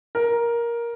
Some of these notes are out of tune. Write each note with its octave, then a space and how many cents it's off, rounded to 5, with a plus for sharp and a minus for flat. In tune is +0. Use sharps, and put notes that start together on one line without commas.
A#4 +10